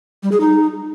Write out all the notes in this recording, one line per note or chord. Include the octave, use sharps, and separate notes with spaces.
G3
G#4
D#4